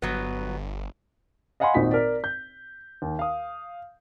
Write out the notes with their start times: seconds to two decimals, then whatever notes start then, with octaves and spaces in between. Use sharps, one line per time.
0.02 G1 F#3 B3
1.60 D#5 F5 F#5 G#5 B5 C6
1.74 G#1 A#2 D#4 F#4 B6
1.91 A#4 D5
2.24 G6
3.02 D#2
3.19 F5 D#6